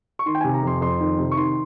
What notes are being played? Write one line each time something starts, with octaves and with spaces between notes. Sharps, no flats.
C#6
D#3 C6
G5
C3 G#5
A#5
F2 C6
F2 C6
D#3
C3
C#6
D#3 C6